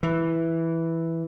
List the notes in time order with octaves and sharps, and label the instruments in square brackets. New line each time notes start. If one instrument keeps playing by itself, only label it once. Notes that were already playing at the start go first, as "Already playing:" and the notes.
[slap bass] E3